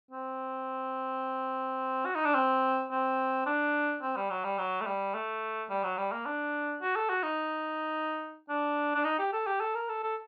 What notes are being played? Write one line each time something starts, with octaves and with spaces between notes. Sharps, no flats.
C4
F#4
D#4
D4
C4
C4
D4
C4
G3
F#3
G3
F#3
A3
G3
A3
G3
F#3
G3
A#3
D4
F#4
A4
F#4
D#4
D4
D4
D#4
G4
A4
G4
A4
A#4
A4
A4